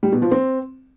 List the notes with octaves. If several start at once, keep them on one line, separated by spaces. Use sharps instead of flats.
G3
B2
F3
C4